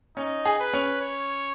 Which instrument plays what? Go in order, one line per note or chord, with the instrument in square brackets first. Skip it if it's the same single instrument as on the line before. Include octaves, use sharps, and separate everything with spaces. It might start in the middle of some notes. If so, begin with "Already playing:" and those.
[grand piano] C#4 [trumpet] D#4
[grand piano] G#4
[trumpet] B4
[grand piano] C#4
[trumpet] C#5